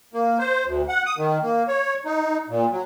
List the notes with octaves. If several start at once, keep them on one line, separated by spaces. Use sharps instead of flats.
A#3
C5
D2
F#5
D#6
D#3
A#3
C#5
D#4
A#2
F#3